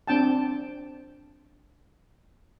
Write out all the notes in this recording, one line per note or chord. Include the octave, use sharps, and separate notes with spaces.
C4 D4 G5 A5